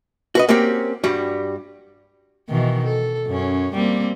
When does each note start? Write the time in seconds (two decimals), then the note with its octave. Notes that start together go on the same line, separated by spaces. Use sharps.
0.35 F#4 B4 D#5
0.49 A#3 C4 C#4 F#4 G4
1.04 G2 G3 F#4
2.49 B2 D#3 E3
2.85 A4
3.27 F#2 C#4
3.74 G3 A#3 C4